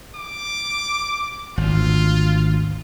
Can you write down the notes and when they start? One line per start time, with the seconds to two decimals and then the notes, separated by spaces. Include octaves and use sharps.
0.15 D6
1.57 G#1 D2 F4